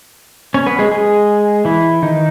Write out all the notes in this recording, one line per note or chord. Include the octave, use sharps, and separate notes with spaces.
C#4 C#5
B3 B4
G#3 G#4
G#3 G#4
E3 E4
D#3 D#4